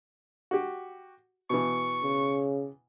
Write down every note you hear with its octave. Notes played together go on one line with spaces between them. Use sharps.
F#4 G4
B2 E3 C#6
C#3